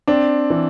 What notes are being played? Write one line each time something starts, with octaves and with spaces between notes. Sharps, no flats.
C4 D4
E3